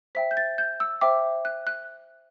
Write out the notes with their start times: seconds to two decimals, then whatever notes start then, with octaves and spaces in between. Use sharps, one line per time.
0.15 C5 E5 G5 B6
0.31 G6
0.37 A6
0.58 G6
0.80 E6
1.01 C5 E5 G5 D6
1.45 F#6
1.67 F#6